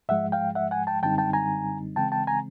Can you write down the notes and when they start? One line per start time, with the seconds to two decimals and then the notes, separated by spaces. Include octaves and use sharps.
0.09 G#2 F3 G#3 E5 F#5
0.32 F5 G5
0.55 E5 F#5
0.71 F#5 G#5
0.87 G5 A5
1.02 F#2 D3 G3 C4 D#4 G5 A5
1.18 G5 A5
1.33 G#5 A#5
1.96 C#3 E3 G#3 C4 G5 A5
2.12 G5 A5
2.27 G#5 A#5